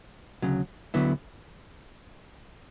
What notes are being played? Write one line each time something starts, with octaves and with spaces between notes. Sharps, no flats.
D2 C#3 F#3
D2 D3 F#3 B3 E4